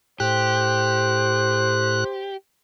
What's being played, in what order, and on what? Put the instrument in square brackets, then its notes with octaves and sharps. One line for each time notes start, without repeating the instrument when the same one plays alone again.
[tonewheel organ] A2 F#6 [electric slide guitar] G4 [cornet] C5